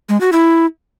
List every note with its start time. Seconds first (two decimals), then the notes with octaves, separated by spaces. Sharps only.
0.09 G#3
0.21 F#4
0.32 E4